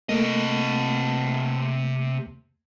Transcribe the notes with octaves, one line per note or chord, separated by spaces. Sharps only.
C3 A3 A#3 D#5